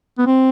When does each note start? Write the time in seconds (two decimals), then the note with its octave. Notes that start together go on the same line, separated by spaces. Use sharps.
0.18 B3
0.26 C4